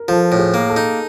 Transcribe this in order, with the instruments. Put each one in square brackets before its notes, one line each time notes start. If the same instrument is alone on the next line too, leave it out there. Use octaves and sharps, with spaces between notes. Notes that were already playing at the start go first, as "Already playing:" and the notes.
Already playing: [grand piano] A#4
[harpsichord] F3 [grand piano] A4
[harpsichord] A2
[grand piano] G#4
[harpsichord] A#3
[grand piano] A4
[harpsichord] D#4